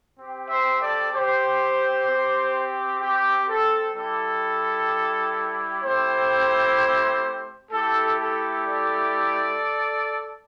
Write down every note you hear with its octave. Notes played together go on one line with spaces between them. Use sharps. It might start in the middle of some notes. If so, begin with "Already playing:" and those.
C4 G4
C5 E5
A4 D5
G4 C5
C4 G4
G4
A4
G3 E4 G4 A4
A3 C4 E4 G4 C5
A3 E4 G4 A4
A4
A4 D5